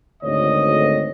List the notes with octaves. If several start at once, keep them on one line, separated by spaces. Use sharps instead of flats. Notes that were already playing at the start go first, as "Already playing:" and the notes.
G#1 D2 C#5 D#5